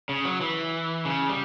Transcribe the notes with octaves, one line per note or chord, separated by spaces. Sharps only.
C#3
F#3
E3
C#3
G3